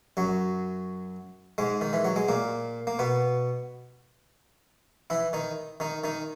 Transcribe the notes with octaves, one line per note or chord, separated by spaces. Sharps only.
F#2 F#3
G#2 G#3
D#3
E3
F#3
G#3
A#2 A#3
A#3
B2 B3
E3 E4
D#3 D#4
D#3 D#4
D#3 D#4